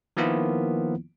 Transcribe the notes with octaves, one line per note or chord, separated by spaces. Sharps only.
D#3 F3 A#3 B3 E4 F4